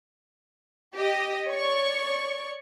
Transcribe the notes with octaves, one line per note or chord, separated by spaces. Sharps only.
G4 D#5
C#5 D5 C#6